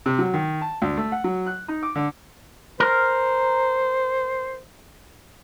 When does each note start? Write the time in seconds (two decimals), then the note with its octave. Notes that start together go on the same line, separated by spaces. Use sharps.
0.06 C3
0.19 F#3
0.34 D#3
0.61 A5
0.82 D2
0.97 A3
1.12 F#5
1.24 F#3
1.46 F#6
1.68 D#4
1.83 D6
1.95 D3
2.80 A#4 C5